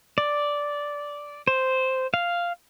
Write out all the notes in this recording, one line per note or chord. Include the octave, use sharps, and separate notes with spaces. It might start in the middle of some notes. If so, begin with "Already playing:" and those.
D5
C5
F5